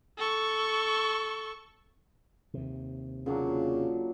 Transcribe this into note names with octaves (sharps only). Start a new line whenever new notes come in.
A4 C#6
D#2 C3
A#2 C#3 F#3 D4